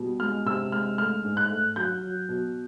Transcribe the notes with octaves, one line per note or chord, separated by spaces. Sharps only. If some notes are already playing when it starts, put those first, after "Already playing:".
Already playing: B2 G3
G#3 F6
C3 E6
G#3 F6
A3 F6
G#2
F#6
A3
F#3 G6
F#3
B2